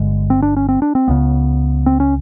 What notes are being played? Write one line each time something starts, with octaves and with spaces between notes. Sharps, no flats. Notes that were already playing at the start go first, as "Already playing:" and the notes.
Already playing: G1 G2 D3 G#3
C4
D4
C#4
C4
D4
C4
C#2 C#3 B3
C4
C#4